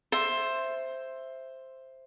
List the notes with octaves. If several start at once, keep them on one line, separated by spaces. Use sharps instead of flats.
C5 E5